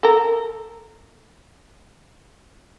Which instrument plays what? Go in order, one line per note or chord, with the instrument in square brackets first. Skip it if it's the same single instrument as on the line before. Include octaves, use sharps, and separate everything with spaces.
[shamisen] A4 A#4